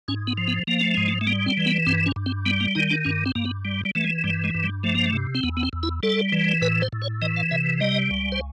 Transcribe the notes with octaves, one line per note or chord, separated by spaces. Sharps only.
G#2 C#4
B3
F3
B3
F3 A#3
A3
G#2 G#3
A3
A3
G3 A#3
C4
E3
B3
G2 C4
C#4
G2
C4
G3 B3
A#3
D#3 D#4
D4
G2 C#4
C4
G2 A#3
B3
G3
G3
E3 A3
G#3
G2 G3
G#3
G2
G3
F3 A3
A#3
A3
C3
C4
E2 B3
B3
C4
E2
E4
G3 A4
E3
A2 B4
C5
A2
C#5
E3 D#5
F5
C3 E5
G3 D#5
C#2
C5